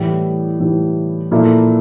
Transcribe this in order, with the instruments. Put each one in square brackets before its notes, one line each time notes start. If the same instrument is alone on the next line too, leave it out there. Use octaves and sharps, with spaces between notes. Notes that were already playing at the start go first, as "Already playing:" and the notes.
Already playing: [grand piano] A2 E3 G3
A2 E3 G3
A#2 F3 A#3 E4 A4